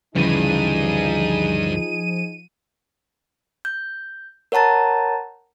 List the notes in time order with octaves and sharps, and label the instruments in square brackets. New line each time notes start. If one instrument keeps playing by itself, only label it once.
[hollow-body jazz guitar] D2 C#3 E3 [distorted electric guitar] G2 [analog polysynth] F3 D#7 [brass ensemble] D#4 G#4
[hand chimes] G6
A#4 C#5 F#5 A5 A#5 A6